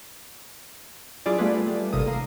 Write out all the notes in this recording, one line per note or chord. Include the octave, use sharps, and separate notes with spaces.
F#3 D4 E4 F4 G#4 D5
G3 A3 B3 F4 G#4 B4
G3 A3
G#1 C3 A#3 A4 D#6
A#3 C7